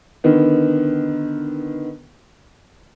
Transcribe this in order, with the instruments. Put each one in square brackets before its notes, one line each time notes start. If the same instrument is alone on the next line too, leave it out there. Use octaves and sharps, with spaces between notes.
[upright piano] D3 D#3 B3